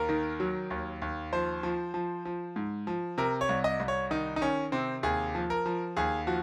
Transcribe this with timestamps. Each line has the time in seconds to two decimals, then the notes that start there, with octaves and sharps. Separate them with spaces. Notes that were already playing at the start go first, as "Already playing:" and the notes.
Already playing: D#2 A#4
0.09 D#3
0.40 F#3
0.70 D#2
1.02 D#2
1.33 F3 C5
1.63 F3
1.94 F3
2.25 F3
2.56 G#2
2.87 F3
3.18 C3 A#4
3.41 C#5
3.49 C2
3.64 D#5
3.80 C2
3.88 C#5
4.11 D#3 D#4
4.36 D#4
4.41 D#3 C#4
4.72 C3 C4
5.03 D#2 G#4
5.35 F3
5.50 A#4
5.66 F3
5.97 D#2 G#4
6.27 F3 F#4